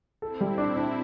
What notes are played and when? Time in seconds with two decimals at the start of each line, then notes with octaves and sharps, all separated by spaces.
0.22 C4 E4 A4
0.41 G3
0.58 D4
0.77 D4